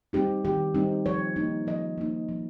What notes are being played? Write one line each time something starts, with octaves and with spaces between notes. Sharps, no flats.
G3 C4 D#4 G4
D#3 G4
G3 C4 D#4
F3 C#5
A#3 D#4
F3 D#5
A#3 D#4
F3